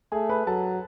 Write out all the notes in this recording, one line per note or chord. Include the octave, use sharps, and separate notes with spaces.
A3 G#4 G#5
B4 B5
F#3 A4 A5